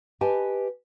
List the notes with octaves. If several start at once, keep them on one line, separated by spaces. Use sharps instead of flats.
G4 B4 D#5 G#5 A5